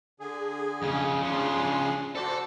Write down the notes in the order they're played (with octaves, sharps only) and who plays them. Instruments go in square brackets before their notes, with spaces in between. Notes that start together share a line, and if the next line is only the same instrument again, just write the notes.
[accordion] D3 G#4
[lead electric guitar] F2 C#3
[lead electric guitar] C#3 F3 [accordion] D4 G#4 C6
[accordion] F#4 C5 D5 [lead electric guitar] A4